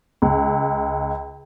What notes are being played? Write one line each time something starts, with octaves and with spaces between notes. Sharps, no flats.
C#2